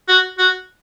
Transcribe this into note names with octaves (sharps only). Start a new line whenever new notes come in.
F#4
F#4